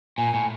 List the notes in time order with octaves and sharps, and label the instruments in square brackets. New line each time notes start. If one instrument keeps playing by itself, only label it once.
[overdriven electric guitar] A#2 [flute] G#5
[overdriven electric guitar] A2